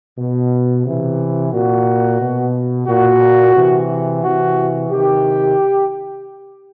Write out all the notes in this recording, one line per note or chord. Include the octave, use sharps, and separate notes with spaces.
B2
C3 E3
A#2 F#4
B2
A#2 F#4
C3 E3
C3 E3 F#4
C3 D#3 G4